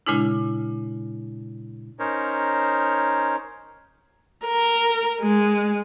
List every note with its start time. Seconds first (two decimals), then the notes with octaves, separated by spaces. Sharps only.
0.06 A#2 C#3 G#3 D4 E4
1.99 C#4 D#4 A#4 C5 C#5
4.45 A#4
5.21 G#3